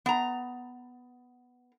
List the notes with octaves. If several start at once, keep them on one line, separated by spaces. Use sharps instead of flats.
B3 A#5